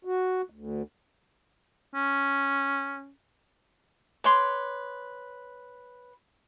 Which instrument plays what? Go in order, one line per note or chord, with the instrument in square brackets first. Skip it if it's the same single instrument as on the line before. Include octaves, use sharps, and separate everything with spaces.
[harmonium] F#4
D2
[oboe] C#4
[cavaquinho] B4 C#5 C6 D6